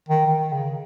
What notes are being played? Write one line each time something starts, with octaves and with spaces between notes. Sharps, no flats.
D#3
D#3
C#3